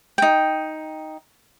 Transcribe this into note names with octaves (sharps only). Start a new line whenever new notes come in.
D#4 G5